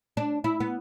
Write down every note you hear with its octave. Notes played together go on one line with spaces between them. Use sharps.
D4
E4
B3